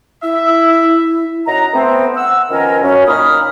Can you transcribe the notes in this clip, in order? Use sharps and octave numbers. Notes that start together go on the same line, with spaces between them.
E4 E5
F#2 D#4 F#5 A#5
A3 B3 C4
F#5 E6
D#3 F3 B3 C#4 A#4
F#2 C#4
A#2 A#3 D#4 B5 D#6 F6